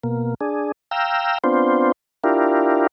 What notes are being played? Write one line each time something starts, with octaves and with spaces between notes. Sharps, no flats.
B2 A#3
D4 G#4
F5 G5 A#5 E6
B3 C4 D4 F4 C5
D4 E4 F4 G4 A#4